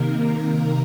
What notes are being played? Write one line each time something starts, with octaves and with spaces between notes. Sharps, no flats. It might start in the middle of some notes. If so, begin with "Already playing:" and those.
Already playing: C3 D#3 A#3 A#4